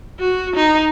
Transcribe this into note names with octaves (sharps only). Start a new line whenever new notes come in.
F#4
D#4